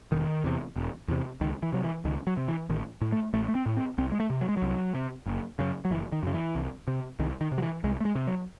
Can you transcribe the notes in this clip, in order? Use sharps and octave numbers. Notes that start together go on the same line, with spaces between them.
E1 D#3
E2 C3
E1
E2 C3
C#2 D#3
E3
C3 F#3
E3
C#2 D#3
F#3
C3
E3
A1 D#3
A2
A3
A1 A3
A3
C4
A2
C4
C2 C4
G#3
A3
C3
F#3
G#3
F#3
C2
C3
F#1
F#2 C#3
F#3
F#1 E3
D#3
F#2 C#3
E3
C2
C3
C2 D#3
D#3
C3
F#3
E3
C2 G#3
A3
G#3
C3
F#3